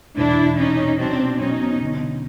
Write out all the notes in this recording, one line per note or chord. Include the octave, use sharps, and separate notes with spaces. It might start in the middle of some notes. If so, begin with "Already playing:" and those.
E1 D4 E4
E1
C3 C#4 D#4
C3
F#3 C4 D4
B2
B1 C#4 D#4
B2
D3